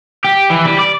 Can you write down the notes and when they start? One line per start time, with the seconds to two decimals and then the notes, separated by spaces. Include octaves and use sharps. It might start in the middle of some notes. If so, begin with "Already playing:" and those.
0.24 G4
0.50 E3
0.65 G3
0.79 D5